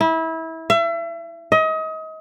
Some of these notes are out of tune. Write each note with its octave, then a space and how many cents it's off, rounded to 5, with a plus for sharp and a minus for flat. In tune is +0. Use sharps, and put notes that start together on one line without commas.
E4 -25
E5 +35
D#5 +30